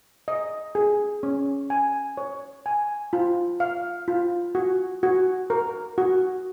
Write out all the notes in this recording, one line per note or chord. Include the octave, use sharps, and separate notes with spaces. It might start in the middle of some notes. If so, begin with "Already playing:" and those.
D#5
G#4
C#4
G#5
C#5
G#5
F4
F5
F4
F#4
F#4
A#4
F#4